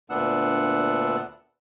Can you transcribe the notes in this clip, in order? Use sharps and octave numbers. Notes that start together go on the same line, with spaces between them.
D2 A#2 B3 D4 F#5 E6